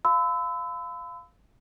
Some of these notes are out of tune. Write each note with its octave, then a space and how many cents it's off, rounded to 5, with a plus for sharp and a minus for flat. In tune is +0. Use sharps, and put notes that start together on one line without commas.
F5 +0 B5 +40 E6 -15